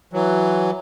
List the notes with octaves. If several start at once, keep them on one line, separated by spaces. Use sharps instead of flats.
E3 F#3